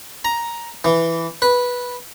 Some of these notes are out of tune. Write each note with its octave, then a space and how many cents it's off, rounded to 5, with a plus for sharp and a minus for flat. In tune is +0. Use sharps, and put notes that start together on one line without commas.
A#5 +10
E3 +5
B4 -10